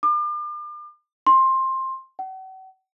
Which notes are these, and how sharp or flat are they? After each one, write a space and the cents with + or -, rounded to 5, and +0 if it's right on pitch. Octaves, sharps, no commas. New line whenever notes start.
D6 +40
C6 +15
F#5 +40